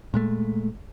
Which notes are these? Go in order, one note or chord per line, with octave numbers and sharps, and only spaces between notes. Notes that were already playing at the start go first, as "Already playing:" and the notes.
A#2 G#3 A3